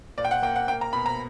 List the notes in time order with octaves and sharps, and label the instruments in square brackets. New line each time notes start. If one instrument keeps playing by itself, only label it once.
[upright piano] A#2 D5
G5
F#5
A#3 G5
F#5
A#3 G5
A#5
B2 B5
A#5